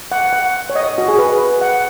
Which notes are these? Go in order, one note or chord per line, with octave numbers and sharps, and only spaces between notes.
F#5
F#5
C#5
D#5
F#4
G#4
B4
F#5